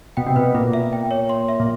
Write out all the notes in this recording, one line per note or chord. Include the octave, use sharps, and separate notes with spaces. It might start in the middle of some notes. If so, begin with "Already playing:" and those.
B2 G5
C3
B2 B4
A#2 B4
E5
G5
C#5
C6
E5
A#2